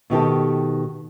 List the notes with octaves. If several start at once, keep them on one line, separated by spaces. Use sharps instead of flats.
B2 D#3 G4 A4